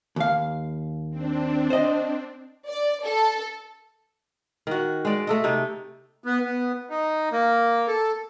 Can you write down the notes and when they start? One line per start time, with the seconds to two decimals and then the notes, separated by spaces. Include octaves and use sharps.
0.16 D#2 F5
1.10 C4 D4
1.70 C5 D#5
2.67 D5
3.04 A4
4.67 D#3 F#4
5.05 G#3 D5
5.27 A3 A4 D#5
5.44 C3 D#4
6.24 B3
6.44 B3
6.90 D#4
7.32 A#3
7.88 A4